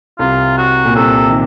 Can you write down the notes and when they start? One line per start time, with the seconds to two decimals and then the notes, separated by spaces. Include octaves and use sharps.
0.19 C2 C3 F4
0.57 F#4
0.85 A#2
0.95 C2 C3 A4
1.28 D#3